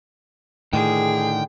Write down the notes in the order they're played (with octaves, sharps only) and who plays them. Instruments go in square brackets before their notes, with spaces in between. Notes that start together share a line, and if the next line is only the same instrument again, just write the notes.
[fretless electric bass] A2 [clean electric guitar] D3 D#3 [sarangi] G#4 [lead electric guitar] G5